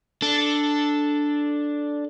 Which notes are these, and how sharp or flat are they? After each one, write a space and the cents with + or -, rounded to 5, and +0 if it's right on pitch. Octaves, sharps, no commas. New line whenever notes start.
D4 +0 A4 +0